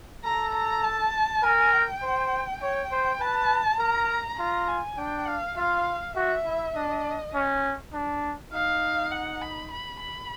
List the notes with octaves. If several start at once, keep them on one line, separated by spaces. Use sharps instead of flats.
A4 A#5
A#5
A5
A#4 G#5
G5
C5
C#5 G5
C5
B4 A5
A#4 A#5
F4 A#5
G#5
D4 G5
F5
F4 F5
F#4 E5
E4
D4 D#5
C#4
D4
D#4 F5
F#5
B5
B5
B5